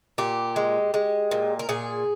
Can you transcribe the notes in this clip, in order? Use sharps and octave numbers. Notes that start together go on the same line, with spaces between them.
A#2 G4
G#3
G#3
A#2
A#4
A#2 G#4